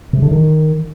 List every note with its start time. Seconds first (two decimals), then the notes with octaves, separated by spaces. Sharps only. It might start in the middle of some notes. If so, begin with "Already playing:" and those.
0.13 C3
0.22 D3
0.31 D#3